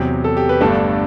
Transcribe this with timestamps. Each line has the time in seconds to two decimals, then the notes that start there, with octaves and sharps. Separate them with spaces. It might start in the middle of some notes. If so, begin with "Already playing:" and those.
Already playing: E2 C3 F#3 G4
0.24 A4
0.37 G4
0.49 B4
0.61 G1 G2 D3 A3 D4 A4